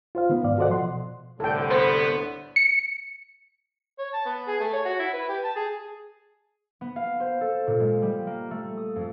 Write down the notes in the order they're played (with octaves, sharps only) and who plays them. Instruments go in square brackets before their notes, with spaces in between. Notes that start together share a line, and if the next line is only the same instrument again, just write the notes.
[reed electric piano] F4 C5 F5
D#3 B3
G#2 D5 F5
F#4 A4 C5 D5 D#5 F#5
F3 C6
B2
[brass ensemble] C2 A2 D3 [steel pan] A4 G5
[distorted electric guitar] B3 [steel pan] C5
[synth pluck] C#7
[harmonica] C#5
A5
B3
G#4
A3
C#5
F#4
E4
B4
G4
A5
G#4
[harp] B3
F5
C5
A4
A#2
G#3
G3
A#3
A3
D#6
F2